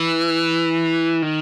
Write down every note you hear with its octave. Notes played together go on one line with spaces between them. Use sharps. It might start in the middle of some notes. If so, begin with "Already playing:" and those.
Already playing: E3
D#3